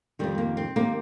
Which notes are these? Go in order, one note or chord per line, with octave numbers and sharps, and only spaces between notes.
F2 C3 D#3 G3
A#3
C4
C3 D#3 A#3